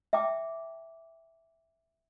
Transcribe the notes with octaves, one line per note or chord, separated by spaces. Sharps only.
E5 G5 A5 D6